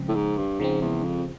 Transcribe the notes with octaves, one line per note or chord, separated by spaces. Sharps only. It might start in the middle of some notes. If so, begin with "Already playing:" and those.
Already playing: C#3 F3 G#3 C4
A2
G#2
G2
G#2 C#3 F3 G#3 C4
E2
F2